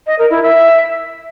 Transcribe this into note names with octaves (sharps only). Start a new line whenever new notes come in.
D#5
A#4
E4
E5